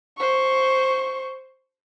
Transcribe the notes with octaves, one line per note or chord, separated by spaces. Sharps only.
C5 C#6